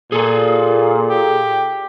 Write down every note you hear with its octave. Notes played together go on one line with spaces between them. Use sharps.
A#2 G#4 A4
G4